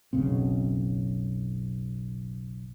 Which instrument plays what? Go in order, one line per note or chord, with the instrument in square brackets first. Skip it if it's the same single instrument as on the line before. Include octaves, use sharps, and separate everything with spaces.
[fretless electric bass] F#1 B1 C#3 C4